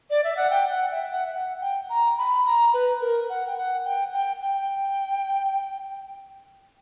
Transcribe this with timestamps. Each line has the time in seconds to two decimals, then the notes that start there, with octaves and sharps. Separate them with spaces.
0.10 D5
0.24 E5
0.37 F#5
0.50 G5
0.71 F#5
0.92 E5
1.12 F#5
1.27 E5
1.34 F#5
1.61 G5
1.89 A#5
2.18 B5
2.46 A#5
2.74 B4
3.01 A#4
3.29 F#5
3.47 G5
3.57 F#5
3.85 G5
4.13 G5
4.41 G5